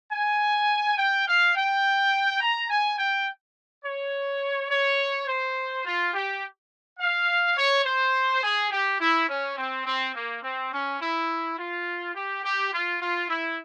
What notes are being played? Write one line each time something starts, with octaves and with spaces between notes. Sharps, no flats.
G#5
G5
F5
G5
A#5
G#5
G5
C#5
C#5
C5
F4
G4
F5
C#5
C5
G#4
G4
E4
C#4
C4
C4
A#3
C4
C#4
E4
F4
G4
G4
F4
F4
E4